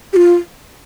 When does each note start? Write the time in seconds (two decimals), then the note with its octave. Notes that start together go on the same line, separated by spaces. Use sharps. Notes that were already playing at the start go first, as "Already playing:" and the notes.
0.13 G4
0.16 F4